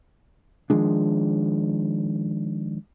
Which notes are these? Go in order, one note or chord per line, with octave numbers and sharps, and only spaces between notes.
D#3 F3 G#3 D4